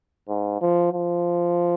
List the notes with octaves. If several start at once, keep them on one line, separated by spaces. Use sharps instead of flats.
G#2
F3
F3